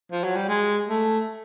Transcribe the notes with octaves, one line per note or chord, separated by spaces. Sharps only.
F3
F#3
G3
G#3
A3